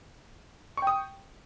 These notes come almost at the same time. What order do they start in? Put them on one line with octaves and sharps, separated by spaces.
C#6 G5 D#6